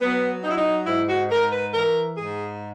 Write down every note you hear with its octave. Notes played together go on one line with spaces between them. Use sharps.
F#3 B3
F#3 D#4
E4
D#4
G#2 E4
F#4
G#2 A#4
B4
E3 A#4
G#2 G#4